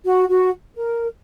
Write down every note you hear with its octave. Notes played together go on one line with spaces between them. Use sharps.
F#4
F#4
A#4